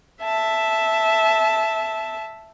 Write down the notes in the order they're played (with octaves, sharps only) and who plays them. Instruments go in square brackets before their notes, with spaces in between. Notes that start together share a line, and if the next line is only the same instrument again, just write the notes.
[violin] E5 A5